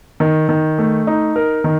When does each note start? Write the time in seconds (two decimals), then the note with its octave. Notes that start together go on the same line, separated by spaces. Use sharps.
0.20 D#3
0.49 D#3
0.78 A3
1.07 D#4
1.36 A#4
1.64 D#3